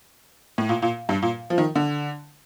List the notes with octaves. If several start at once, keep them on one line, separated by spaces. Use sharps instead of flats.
A2
A#2
A#2
G2
A#2
F3
D#3
D3